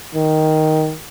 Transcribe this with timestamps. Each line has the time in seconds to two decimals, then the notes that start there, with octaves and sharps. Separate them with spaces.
0.15 D#3